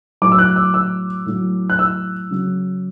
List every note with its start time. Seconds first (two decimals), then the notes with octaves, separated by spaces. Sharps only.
0.22 A2 F#3 D6
0.32 E6
0.39 F#6
0.56 E6
0.74 E6
1.26 A2 F#3
1.70 F#6
1.79 E6
2.31 C#3 F#3